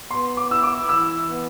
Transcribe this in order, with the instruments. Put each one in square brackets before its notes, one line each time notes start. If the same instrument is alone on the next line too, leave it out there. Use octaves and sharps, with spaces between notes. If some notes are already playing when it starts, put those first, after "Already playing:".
[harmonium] B3 [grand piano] C6
[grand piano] D6
[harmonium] E4 [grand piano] E6
[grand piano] D6
[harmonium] E3 [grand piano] E6
[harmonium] B3